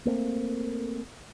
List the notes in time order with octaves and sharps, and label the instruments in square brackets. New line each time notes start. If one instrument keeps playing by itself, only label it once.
[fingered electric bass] A3 A#3 C4